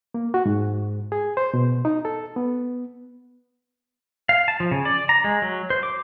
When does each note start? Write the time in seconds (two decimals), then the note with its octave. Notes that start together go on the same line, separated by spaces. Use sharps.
0.14 A#3
0.34 F#4
0.46 G#2
1.12 G#4
1.37 C5
1.54 B2
1.85 D#4
2.05 A4
2.36 B3
4.29 F5
4.48 A5
4.60 F3
4.71 C#3
4.85 D5
5.09 A#5
5.24 G#3
5.42 F#3
5.70 C5
5.83 D6